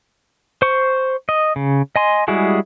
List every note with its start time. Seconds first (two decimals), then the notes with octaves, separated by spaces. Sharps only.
0.62 C5 C#6
1.29 D#5
1.56 C#3
1.96 D#5 G#5 C6
2.28 G3 G#3 E4 F#4 G#4